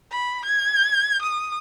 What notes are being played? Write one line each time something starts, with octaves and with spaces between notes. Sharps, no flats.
B5
G#6
D#6